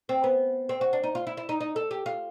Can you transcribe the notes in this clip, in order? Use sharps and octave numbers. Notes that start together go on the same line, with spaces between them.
C4
B3
C4
F#4
D4
D#4
F4
E4
E4
D#4
D#4
A4
G4
F4